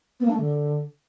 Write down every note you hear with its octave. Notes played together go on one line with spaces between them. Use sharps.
B3
A#3
D4
A3
D3